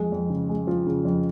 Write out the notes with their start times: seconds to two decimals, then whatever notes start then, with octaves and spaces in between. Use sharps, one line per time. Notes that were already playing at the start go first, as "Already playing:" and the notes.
Already playing: F2 G#3
0.12 F2
0.30 C#3
0.49 G#3
0.67 F3
0.87 C#3
1.05 F2